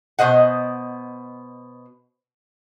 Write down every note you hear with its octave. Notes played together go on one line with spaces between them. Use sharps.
B2 C5 D#5 F#5